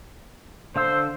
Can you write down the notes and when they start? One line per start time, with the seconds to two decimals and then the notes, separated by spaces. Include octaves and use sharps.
0.76 D3 C5 F5 E6